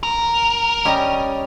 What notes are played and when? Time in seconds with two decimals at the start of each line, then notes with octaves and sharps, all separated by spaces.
0.03 A#4
0.85 G3 C#4 D#5